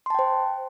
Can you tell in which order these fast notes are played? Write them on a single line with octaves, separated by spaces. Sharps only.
C6 A5 G5 C5